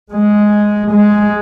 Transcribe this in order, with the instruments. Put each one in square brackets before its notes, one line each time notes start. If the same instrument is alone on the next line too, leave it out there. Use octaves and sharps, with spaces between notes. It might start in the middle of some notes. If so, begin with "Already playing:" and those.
[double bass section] G#3
G#3